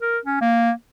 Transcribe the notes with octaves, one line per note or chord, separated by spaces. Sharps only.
A#4
C#4
A#3